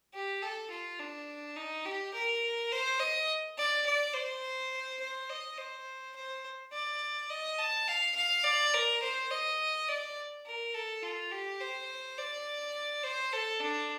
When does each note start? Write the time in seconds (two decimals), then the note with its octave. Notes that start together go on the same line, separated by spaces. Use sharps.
0.14 G4
0.42 A4
0.70 F4
0.99 D4
1.56 D#4
1.85 G4
2.13 A#4
2.71 C5
2.99 D#5
3.57 D5
3.86 D5
4.15 C5
5.00 C5
5.29 D#5
5.57 C5
6.16 C5
6.72 D5
7.30 D#5
7.59 A5
7.88 F5
8.15 F5
8.44 D5
8.74 A#4
9.02 C5
9.30 D#5
9.88 D5
10.46 A#4
10.74 A4
11.03 F4
11.31 G4
11.60 C5
12.18 D5
13.03 C5
13.32 A4
13.60 D4